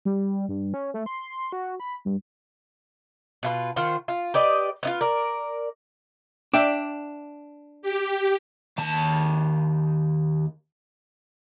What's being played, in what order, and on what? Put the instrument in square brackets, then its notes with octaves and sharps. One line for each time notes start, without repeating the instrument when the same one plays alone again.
[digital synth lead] G3
G2
C#4
A3
C6
F#4
B5
G2
[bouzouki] B2 F4 B4
D#3 F4 C5 F#5
F4
G4 B4 D5 D#5
B3 D#4 F4
A#4 D5
[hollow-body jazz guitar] D4 [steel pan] E5 G5 D6
[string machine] G4
[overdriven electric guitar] D#2 A5